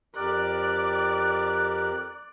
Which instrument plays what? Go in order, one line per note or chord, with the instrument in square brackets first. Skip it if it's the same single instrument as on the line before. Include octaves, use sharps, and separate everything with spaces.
[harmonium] F2 G4 A#4 [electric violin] D5 [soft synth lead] F#6